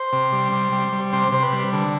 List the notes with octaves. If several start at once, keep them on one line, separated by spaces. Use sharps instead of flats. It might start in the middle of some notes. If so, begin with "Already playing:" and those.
Already playing: C5
C3
G3
C3
G3
G3
C3 C5
C3 C5
B4
G3
D3